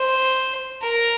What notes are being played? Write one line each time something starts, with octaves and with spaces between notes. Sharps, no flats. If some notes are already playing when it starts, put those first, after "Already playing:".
Already playing: C5
A#4